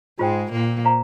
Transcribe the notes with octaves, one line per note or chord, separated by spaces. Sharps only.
G#2 G#3 F4 C5 G5
A#2 A#3
C5 F5 A#5